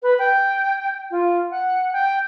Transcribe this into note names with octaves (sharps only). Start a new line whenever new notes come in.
B4
G5
F4
F#5
G5